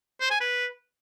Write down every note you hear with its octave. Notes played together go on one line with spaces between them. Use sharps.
C5
G#5
B4